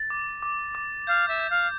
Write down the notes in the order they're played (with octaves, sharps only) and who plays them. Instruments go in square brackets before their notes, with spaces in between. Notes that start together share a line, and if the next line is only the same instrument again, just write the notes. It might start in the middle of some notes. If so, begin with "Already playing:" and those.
Already playing: [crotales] A6
D6
D6
D6
[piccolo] F5 [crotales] G6
[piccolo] E5
[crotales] G6
[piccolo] F5